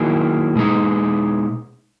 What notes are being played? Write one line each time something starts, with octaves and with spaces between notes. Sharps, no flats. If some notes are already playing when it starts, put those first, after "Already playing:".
Already playing: D#3 F#3 A#3 E4 G#4
B2 G#3 D#4 G#4